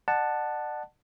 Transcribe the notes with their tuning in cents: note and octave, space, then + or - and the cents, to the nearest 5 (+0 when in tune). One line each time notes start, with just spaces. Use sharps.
D5 +40 F#5 +0 A5 +0